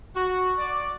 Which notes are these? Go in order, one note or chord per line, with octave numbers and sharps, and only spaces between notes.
F#4
D5